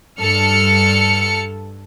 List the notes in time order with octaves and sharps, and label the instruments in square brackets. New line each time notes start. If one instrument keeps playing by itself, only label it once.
[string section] G2 A4 F6 C#7